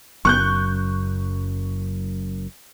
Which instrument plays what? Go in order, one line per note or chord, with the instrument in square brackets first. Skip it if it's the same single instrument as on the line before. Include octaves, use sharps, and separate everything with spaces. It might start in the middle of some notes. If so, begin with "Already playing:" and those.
[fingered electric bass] F#1 F#2 [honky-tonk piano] C#6 F#6 G6